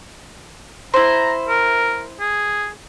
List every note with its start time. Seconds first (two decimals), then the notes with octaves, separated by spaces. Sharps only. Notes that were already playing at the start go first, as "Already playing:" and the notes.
0.94 E4 C5 A#5
1.48 A#4
2.20 G#4